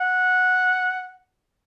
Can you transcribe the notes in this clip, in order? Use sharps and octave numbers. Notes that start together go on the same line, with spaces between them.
F#5